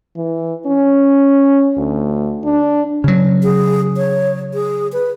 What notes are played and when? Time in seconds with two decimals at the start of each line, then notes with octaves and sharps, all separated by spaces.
0.16 E3
0.66 C#4
1.77 D2
2.44 D4
3.04 C#3 F#3
3.43 G#4
3.97 C#5
4.54 G#4
4.93 B4